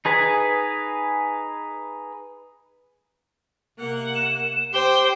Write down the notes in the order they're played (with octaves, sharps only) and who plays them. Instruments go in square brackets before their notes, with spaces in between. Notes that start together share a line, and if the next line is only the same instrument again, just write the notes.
[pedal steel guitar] D#4 G#4 B4 G#5
[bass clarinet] C3 [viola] A#3 F#5
[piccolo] E7
[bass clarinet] G4 [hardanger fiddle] C5 [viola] G5 [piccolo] G7